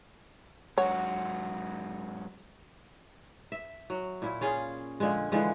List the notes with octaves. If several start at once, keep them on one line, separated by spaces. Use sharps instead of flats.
G#2 F#3 C#5 F#5
E5
F#3
A#2 E4
C#4 F4 G#4
A#2 D3 F3 G#3
D3 E3 F3 G#3